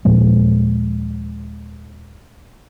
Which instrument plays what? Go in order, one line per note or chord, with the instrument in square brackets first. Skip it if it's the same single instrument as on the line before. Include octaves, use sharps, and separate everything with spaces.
[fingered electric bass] D#2 A#2 F3 G#3